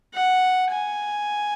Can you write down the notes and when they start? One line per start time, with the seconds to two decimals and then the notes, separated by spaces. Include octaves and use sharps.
0.14 F#5
0.70 G#5